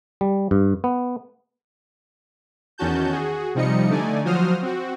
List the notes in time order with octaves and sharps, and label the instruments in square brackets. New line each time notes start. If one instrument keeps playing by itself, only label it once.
[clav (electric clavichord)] G3
G2
B3
[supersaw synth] E2 D#3 C#4 F#4 A5 G6
F#4 G#4
C3 F3 G3 D#4 D#5 C#7
D3 A3 D#4 D5 G#5
F3 F#3 F#4 C5 D#6 F6
C4 F#4